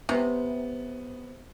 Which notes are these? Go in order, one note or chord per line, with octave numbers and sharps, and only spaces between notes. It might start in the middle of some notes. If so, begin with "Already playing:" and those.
C3 B3